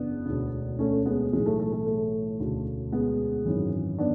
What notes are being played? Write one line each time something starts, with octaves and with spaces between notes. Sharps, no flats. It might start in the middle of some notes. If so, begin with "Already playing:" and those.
Already playing: F#1 E2 B3 D4
E1 D2 D3
A3 C#4
G#3 B3
B1 A2 E3 G#3
A3
A3
A3
A3
E1 D2 C#3
G#3 B3
G#1 F#2 E3
B3 D4